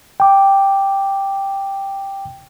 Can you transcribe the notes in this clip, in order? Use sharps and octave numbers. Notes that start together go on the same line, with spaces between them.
G5 D6